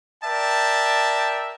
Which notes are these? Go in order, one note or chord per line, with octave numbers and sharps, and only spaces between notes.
A#4 D5 E5 G5 A5